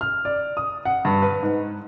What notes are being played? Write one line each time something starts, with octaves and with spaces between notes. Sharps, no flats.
F6
D5
D#6
F#5
G2
B4
G#2